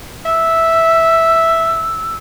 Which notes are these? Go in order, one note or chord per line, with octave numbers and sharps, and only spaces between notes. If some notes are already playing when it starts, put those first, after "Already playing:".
E5 E6